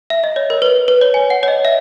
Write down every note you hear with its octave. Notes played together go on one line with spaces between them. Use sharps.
E5
D#5
C#5
A#4
B4
B4
C#5
G#5
F#5
C#5
D#5
E5